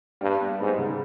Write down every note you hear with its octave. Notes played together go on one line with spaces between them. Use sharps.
G2 G3
B3
G#2 B3
C#3